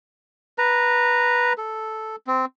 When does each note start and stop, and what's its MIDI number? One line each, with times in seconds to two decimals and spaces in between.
0.58 1.53 71
0.58 1.53 82
1.58 2.16 69
2.27 2.45 60